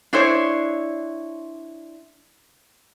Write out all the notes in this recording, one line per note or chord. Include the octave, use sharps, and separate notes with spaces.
D4 E4 C5 C#5